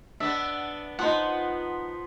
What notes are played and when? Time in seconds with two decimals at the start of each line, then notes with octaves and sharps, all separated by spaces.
0.20 B3 D4 E5
0.99 F3 B3 D#4 C5 F#5